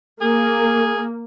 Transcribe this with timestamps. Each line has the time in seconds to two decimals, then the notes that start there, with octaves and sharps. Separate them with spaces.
0.21 A#3 G#4